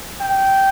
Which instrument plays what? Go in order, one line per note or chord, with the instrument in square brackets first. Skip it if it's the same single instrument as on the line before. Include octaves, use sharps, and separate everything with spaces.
[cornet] G5